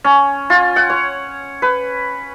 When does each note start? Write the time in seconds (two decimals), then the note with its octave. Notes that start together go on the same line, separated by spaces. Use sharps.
0.04 C#4
0.50 F4
0.76 F#5
0.90 C#5
1.62 B4